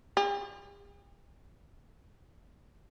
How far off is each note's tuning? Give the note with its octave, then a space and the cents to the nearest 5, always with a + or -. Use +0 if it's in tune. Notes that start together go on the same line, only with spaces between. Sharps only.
G4 +45